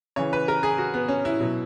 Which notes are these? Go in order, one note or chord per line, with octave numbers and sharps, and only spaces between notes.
C#3 E3 C#5
B4
A#4
G#4
F#4
B3
C#4
E4
B2 F#3